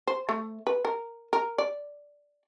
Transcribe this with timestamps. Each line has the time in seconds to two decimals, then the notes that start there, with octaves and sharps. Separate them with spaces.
0.07 C5
0.29 A3
0.67 B4
0.85 A#4
1.33 A#4
1.58 D5